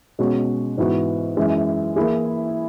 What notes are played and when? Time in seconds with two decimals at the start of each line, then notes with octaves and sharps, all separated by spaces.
0.19 B2 G#3 C#4 F#4
0.77 G#2 E3 B3 F#4
1.37 F#2 E3 G#3
1.96 E3 A#3 E4 G#4